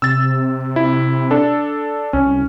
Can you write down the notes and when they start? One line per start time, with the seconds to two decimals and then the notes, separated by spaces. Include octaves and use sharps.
0.02 C3 E6 A6
0.76 E4
1.31 D4 A4
2.13 C2 C#4